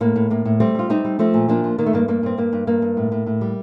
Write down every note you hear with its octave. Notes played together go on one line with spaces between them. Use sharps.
A2 A#3
A2
A2 A#3
A2
G3 A3 C4
G3 F4
G3 C4 D#4
G3
F3 A3 C4
A#2
F3 A#3 D4
F3
D#3 A#3
A3
G2 A#3
G2 A#3
G2 C4
G2 A#3
G2
G2 A#3
G2
A2
A2
A2
G3